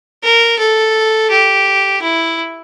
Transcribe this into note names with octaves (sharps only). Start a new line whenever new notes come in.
A#4
A4
G4
E4